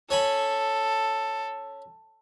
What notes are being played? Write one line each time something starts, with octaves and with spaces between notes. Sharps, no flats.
C#4 A4 G#5 B5